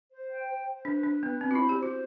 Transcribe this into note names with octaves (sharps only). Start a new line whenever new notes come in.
C5
G5
C5
C5
D4 B4
D4 B4
B3 B4
C4 B5
F#4
E4 C5
G4
F#4 C5